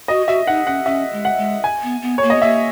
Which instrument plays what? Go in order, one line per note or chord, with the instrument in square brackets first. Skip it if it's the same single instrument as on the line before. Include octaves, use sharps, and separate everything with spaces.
[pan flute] F#4 [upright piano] D#5
[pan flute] F#4 [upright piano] E5
[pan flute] D#4 [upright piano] F#5
[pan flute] C#4 [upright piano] F#5
[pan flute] C#4 [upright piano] E5
[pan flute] G#3
[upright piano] F#5
[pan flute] G#3
[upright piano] G#5
[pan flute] B3
B3
[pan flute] A#3 [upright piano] C#5
[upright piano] D#5
[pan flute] B3
[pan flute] A#3 [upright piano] E5